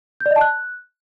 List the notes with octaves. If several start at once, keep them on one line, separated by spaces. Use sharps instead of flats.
G6
D5
D#5
A5
F#6